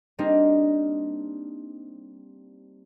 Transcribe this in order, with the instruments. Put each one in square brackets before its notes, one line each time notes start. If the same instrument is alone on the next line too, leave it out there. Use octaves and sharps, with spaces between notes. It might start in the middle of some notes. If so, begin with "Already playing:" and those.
[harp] G3 A#3 C4 D4 D#4